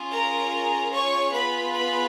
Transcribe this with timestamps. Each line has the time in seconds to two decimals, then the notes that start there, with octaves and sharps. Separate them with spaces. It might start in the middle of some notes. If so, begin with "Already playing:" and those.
Already playing: C#4 F4 G#4
0.12 A#4 A#5
0.92 C#5 C#6
1.32 B3 F4 G#4 B4 B5
1.73 B4 B5